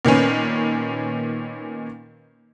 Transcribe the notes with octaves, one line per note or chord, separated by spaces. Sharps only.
A#2 D#3 B3 C#4